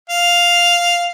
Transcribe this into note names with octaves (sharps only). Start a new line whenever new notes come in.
F5